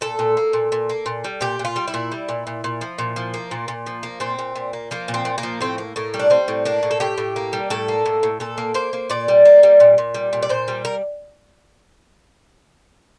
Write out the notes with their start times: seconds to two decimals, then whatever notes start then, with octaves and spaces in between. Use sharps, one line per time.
0.01 A#2 A4
0.19 A#2
0.37 A#3
0.53 A#2
0.72 A#2
0.89 A#3
1.06 A#2
1.24 G3
1.41 A#2 G4
1.59 A#2
1.65 F4
1.76 G3
1.88 E4
1.94 A#2
2.12 G3
2.29 A#2
2.47 A#2
2.64 A#2
2.81 F3
2.99 A#2
3.16 F3
3.34 A#3
3.51 A#2
3.68 A#2
3.86 F3
4.03 A#3
4.20 A#2 C4
4.39 A#2
4.56 A#2
4.73 A#3
4.91 F3 A#3
5.08 A#2
5.14 C4
5.25 A#2
5.38 A#3
5.43 F3
5.61 A2 C4
5.78 A#3
5.96 A2 A#3
6.14 G3
6.19 D4
6.30 G3 C4
6.48 A2
6.65 A#3 D4
6.83 A2
6.91 A4
7.00 A2 G4
7.18 A2
7.36 A#3
7.53 G3
7.70 A2 A4
7.88 A#3
8.06 A2
8.23 A2
8.40 A#2 A4
8.58 A#3
8.74 A#3 C5
8.93 A#3
9.10 A#2 D5
9.28 G3
9.45 A#3
9.63 G3
9.80 A#2
9.98 A#2
10.14 G3
10.33 A#2
10.43 D5
10.49 A#2 C5
10.68 G3
10.85 A#4